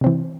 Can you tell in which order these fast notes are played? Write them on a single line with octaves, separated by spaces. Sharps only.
C3 C4 E3